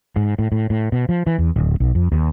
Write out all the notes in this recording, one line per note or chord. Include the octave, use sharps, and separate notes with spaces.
G#2
A2
A2
A2
B2
F3
E3
E2
D1
B1
F2
D#2